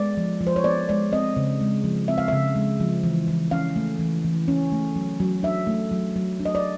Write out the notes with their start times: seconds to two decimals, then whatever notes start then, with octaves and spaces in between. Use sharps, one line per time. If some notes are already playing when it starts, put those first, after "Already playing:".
Already playing: G#3 B3 D5
0.17 F3
0.41 F3
0.47 C5
0.56 C#5
0.64 B3 D5
0.89 G#3 D5
1.12 C4 D#5
1.37 C#3
1.61 G#3
1.84 F3
2.08 C4 E5
2.18 F5
2.28 C#3 E5
2.56 G#3
2.80 F3
3.04 E3
3.28 E3
3.51 C#4 F5
3.76 A3
3.99 E3
4.24 E3
4.48 C#4
4.72 A3
4.96 F#3
5.20 F#3
5.43 D4 E5
5.67 A3
5.91 F#3
6.16 F#3
6.40 D4
6.45 D#5
6.55 D5